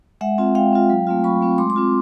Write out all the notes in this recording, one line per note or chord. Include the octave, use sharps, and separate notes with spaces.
G#3 E5 F#5
C4 F4
G#3 F5 G5
C4 F4
F#3
A3 C4 F4
F#3 B5 C#6
A3 C4 F4
G#3 C6 D6
C6 D6
C4 F4